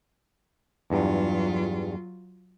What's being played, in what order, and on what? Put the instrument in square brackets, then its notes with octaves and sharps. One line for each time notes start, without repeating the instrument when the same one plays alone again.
[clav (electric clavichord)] E2 G2 [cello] F#3 F4